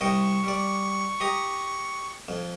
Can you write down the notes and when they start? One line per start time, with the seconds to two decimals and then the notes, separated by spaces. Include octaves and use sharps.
0.01 C2 D#5 G5 C#6
0.44 G3 D5
1.20 G4 D#5 A#5
2.28 F2